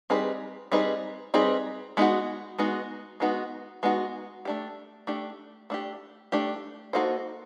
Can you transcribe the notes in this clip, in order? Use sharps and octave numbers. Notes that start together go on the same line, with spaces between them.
G3 C4 D#4 G#4 B4
G3 C4 D#4 G#4 B4
G3 C4 D#4 G#4 B4
G#3 B3 D#4 F#4
G#3 B3 D#4 F#4
G#3 B3 D#4 F#4
G#3 B3 D#4 F#4
A3 D4 G4
A3 D4 G4
A3 D4 G4
A3 D4 G4
A#3 D#4 F#4 A4 C5